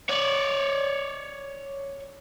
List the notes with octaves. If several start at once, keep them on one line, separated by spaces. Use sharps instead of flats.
C#5 D5